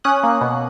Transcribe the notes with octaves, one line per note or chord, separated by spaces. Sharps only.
C#4 D#6 F#6
A#3
B2